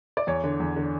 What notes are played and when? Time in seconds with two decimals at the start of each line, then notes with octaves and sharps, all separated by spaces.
0.17 D5
0.27 E2 C#5
0.44 D3
0.60 E2
0.76 D3